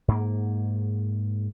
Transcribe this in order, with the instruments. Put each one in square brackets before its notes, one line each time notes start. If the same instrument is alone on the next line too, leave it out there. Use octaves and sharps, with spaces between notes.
[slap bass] G#2 A#3